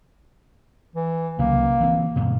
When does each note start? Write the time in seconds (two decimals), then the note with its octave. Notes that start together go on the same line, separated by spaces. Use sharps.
0.96 E3
1.39 C2 C#3 F#3 A#3
1.80 E3 C4
2.16 D2 G2 B2